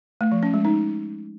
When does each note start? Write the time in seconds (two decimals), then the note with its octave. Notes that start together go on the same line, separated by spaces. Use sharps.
0.21 A3
0.32 F3
0.43 C#4
0.54 G#3
0.65 D#4